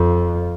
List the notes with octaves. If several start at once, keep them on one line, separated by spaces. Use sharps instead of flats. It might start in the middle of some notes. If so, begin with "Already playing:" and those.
Already playing: F2